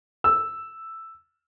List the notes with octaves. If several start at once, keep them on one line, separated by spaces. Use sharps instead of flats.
E6